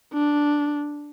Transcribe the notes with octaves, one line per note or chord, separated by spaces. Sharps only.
D4